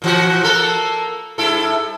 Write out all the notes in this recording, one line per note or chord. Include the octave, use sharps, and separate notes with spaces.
A#2 E3 F#4
A#3 A4 A#4
G2 E4 A4